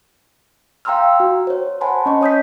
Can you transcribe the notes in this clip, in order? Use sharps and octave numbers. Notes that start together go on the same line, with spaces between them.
F5 G5 A#5 C6 E6 F6
F#4
C5 C#5
C5 F#5 G#5 A5 B5 C6
C#4 D#5 C#6
C#5 D#6 G6 B6